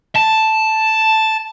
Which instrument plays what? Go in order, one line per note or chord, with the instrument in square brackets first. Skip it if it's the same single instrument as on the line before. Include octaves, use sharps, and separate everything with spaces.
[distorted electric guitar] A5